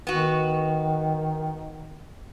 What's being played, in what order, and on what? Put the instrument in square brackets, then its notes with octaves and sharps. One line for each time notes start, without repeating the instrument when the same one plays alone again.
[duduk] D#3 [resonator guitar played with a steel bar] B3 F#4